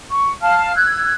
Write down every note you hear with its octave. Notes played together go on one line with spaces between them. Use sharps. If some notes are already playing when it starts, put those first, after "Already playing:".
C#6
F5 A5 F6
E6 F#6 G#6